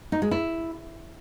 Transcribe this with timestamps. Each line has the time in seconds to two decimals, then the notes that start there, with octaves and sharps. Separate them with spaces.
0.12 D#4
0.22 G#3
0.31 E4